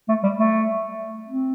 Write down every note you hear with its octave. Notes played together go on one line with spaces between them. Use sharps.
A3
G3
A3
C4